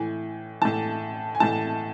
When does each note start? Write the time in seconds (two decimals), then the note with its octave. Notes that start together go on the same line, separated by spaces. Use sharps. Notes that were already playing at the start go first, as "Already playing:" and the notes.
Already playing: A2 E3 G#5
0.61 A2 E3 A5
1.35 G#5
1.40 A2 E3 A5